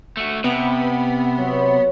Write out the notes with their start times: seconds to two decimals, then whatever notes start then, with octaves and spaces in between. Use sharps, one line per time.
0.17 A3 F#4
0.44 C3 B3
1.38 F#3